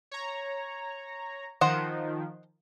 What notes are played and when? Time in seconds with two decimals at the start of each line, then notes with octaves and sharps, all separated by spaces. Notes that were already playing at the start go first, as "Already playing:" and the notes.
0.11 C#5 A#5
1.61 D#3 F3 C5 D#5 F#5